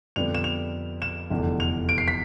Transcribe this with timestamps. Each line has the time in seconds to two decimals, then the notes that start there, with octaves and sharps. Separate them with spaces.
0.16 F2 D3 G3 B3 F7
0.34 E7
0.44 F7
1.02 E7
1.30 F1 E2 D3
1.60 F7
1.89 D7
1.98 C7
2.08 B6